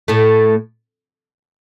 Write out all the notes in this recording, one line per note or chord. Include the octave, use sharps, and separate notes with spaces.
A2 A3